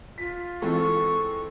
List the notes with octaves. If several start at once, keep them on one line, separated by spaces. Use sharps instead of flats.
F4 B6
E3 G#3 C4 A4 C#6